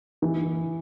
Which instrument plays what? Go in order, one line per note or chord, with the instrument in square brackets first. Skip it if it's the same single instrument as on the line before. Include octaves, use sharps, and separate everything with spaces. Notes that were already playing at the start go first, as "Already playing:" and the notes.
[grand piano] E3